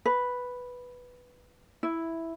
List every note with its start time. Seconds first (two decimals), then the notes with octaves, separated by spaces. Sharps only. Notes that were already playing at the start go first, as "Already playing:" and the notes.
0.06 B4
1.83 E4